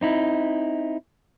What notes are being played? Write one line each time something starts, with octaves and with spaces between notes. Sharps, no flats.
C4 D#4 E4